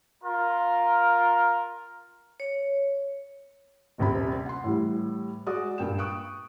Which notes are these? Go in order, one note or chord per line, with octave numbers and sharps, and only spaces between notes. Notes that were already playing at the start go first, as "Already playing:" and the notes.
F4 A#4
C#5
D#1 A#1 C3 B5
F#5 C6
A2 E3 G3
G#3 F#4 D5 D#6
G2 A#2 G5 E7
C#6 D#6 F#6 D7